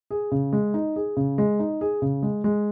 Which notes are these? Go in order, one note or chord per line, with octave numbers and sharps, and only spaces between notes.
G#4
C#3
G#3
D#4
G#4
C#3
G#3
D#4
G#4
C#3
G#3
G#3